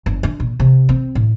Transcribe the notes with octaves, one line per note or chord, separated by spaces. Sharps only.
G1
D3
A#2
C3
C4
A2